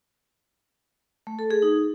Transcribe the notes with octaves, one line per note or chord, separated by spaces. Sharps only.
A3
A4
G#4
D#4